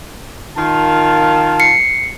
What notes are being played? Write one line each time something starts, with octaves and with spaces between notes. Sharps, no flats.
D#3 F4 A5
C7 C#7